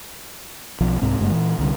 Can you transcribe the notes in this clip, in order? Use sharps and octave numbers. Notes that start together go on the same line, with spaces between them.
B1 F3
C2 G#2 C4
F#1 G2 G#3 A#3
A#2 E3
C2 D3 G3